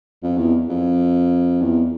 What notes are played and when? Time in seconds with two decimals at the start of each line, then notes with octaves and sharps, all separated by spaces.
0.23 F2
0.37 E2
0.69 F2
1.62 E2